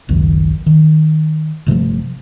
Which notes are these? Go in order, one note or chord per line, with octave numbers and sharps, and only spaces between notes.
G#1 C#2 F#2 D#3
D#3
G1 C3 F3 A3